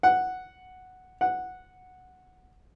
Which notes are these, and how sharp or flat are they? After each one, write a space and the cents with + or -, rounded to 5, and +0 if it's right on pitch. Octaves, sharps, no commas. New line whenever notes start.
F#5 +0
F#5 -5